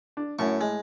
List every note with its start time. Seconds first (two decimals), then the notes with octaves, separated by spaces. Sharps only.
0.17 D4
0.39 F#2 A2 C#6
0.61 G#3